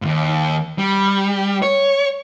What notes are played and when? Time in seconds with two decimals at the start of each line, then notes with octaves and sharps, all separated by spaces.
0.02 D#2 G#2
0.78 G3
1.62 C#5